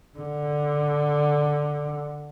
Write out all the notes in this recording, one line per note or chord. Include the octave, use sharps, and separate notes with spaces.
D3